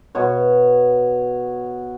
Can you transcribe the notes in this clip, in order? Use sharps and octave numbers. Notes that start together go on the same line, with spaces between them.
B2 C#5